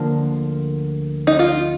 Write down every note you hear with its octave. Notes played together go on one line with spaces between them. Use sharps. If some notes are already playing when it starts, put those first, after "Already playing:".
Already playing: D2 D3 F3 A#3
D#4
F4